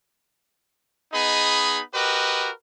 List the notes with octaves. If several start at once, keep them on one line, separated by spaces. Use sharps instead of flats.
B3 D#4 G#4 D#5 B5
F#4 G4 A#4 B4 D#5